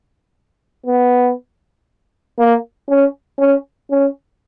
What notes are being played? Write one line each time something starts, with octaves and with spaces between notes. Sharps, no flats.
B3
A#3
C#4
C#4
C#4